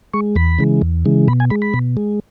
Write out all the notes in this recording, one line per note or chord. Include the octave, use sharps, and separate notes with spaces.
G#3 C#6
E2 B5
C#3 E3 G#3
E2
C#3 E3 G#3
B2 B5
G#5
G#3 B5
B5
B2
G#3